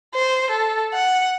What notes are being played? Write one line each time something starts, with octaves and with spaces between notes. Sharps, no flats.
C5
A4
F#5